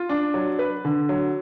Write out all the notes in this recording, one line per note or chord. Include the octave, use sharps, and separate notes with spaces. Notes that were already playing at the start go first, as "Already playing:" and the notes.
Already playing: F4
D4
F#3
B4
D3
F#3